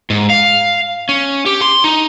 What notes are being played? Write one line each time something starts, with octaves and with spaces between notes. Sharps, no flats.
G#2
F5
C#4
G4
C6
D#4